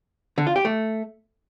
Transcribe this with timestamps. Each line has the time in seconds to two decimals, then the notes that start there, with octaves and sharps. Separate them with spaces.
0.38 D3
0.47 F4
0.56 G4
0.65 A3